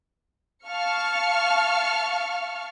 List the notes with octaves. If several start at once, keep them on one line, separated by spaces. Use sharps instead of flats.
F5 A5 C#6 F6 C#7